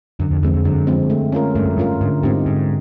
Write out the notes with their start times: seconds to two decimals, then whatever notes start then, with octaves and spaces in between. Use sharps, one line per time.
0.20 F#2 D3
0.31 F2
0.43 E2 F3 G#3 C4
0.54 F2
0.64 F#2 D3
0.87 F3 G#3 C4
1.10 A3
1.32 C#4 F4 A#4
1.55 G2 A3
1.66 F#2
1.77 G2 C#4 F4 A#4
2.01 G#2 D3
2.23 G#2 G3 C4 D#4 G4
2.46 G#2 D3